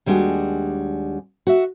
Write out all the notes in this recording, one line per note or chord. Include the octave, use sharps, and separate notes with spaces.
D#2 G3 G#3 D4 F#4 G#5
F#4 E5